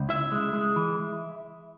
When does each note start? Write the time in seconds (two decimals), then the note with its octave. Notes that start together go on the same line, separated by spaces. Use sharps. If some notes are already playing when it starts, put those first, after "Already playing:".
Already playing: C#2
0.09 E4 E5
0.32 G#3
0.53 G#3
0.76 E3